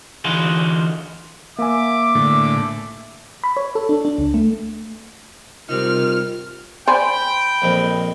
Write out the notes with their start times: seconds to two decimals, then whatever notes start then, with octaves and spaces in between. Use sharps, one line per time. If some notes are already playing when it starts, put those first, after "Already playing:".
0.24 D3 E3 D#4 F4 F#4 G#4
1.59 A#3 E5 G#5 D6
2.15 A2 D3
3.44 B5
3.57 C#5
3.75 A4
3.89 D4
4.05 D4
4.18 C#2
4.34 A3
5.69 C3 G3 C4 D#4 F4 A#4 F6
6.88 C5 D5 G5 G#5 B5
7.62 A#1 F2 G#3